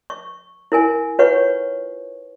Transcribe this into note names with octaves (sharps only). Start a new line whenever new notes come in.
C#6
E4 A#4 G#5
F4 B4 C#5 F#5 C#6